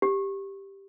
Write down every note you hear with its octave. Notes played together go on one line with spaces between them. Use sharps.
G4